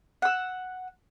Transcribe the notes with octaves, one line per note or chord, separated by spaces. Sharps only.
F#5 E6